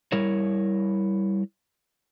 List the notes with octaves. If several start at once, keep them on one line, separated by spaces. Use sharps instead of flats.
G3 E4 A#4 C#5